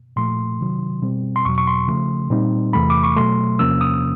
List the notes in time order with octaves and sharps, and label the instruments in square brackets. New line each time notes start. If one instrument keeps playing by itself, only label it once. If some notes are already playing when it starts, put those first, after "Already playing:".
[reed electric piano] A#2 F3 A3 C6
C3 D#3 F#3
B2 G3 C4
C6
E2 B2 F#3 C#6
C#6
C6
C#3 F3 A3
A#2 G3 C4 D#4
E2 C3 E3 A3 B5
D6
C#6
B2 F#3 A3 C6
E2 C3 F3 A#3 C#4 E6
D#6